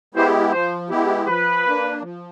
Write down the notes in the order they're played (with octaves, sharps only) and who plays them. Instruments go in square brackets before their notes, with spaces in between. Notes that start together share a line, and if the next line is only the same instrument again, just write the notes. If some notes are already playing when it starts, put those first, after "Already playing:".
[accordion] G#3 B3 E4 G4 [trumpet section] C5
[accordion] F3 [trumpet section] C5
[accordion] G#3 B3 E4 G4
[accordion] F3 [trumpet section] B4
[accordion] A#3 D4
F3